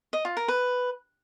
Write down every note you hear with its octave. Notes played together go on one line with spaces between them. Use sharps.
D#5
F4
A#4
B4